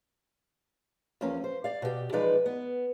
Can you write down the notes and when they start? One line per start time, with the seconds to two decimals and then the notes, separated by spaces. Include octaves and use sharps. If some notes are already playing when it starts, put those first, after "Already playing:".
1.21 E2 F3 A#3 C#4
1.44 C5
1.64 D5 F5
1.82 B2 G4
2.12 E3 F3 G#3 D#4 B4 D5
2.46 B3